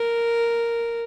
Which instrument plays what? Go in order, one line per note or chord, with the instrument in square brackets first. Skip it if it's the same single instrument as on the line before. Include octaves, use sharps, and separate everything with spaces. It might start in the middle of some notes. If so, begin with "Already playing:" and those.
Already playing: [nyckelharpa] A#4